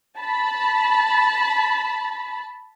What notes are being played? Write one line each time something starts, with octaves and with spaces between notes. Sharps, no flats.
A5 B5